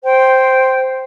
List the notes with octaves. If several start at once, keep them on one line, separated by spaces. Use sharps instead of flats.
C5 G5